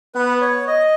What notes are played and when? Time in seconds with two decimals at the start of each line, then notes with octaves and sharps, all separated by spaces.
0.15 B3 B4
0.41 C#5
0.67 D#5